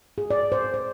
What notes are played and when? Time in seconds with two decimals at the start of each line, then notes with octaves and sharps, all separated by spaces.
0.18 G#4
0.31 D5
0.52 C5
0.74 C5